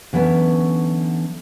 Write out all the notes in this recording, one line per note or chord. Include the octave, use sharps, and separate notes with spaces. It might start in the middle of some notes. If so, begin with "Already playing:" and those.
D3 E3 F#3 B3 C#4